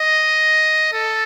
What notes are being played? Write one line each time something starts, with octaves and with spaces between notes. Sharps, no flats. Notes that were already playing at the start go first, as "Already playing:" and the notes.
Already playing: D#5
A4